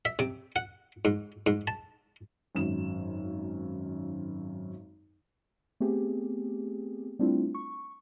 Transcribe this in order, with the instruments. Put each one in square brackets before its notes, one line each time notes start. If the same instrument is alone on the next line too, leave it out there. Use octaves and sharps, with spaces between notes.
[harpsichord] E5
C3
F#5
G#2
G#2
A5
[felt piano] G#1 F#2 E7
[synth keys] A3 B3 C4 G4 G#4
G3 A3 C4 D4 E4 F4
C#6